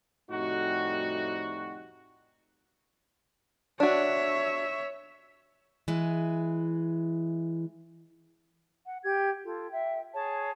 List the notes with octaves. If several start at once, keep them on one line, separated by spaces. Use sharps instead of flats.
F2 A2 C3 G3 D#4 F#4
D4 F#4 C#5 E5
E3 G#3
F#5
G4 G#6
F4 A4
E5 G5
G#4 C#5 A5